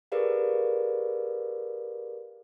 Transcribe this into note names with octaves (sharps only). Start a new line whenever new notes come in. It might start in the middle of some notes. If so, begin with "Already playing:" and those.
G4 G#4 A#4 B4 D5 F5